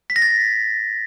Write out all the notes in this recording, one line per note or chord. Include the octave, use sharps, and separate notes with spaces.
B6
A#6
A6